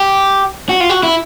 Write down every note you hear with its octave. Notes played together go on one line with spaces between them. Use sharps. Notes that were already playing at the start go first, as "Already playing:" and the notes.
Already playing: G4
F#4
F4
F#4
E4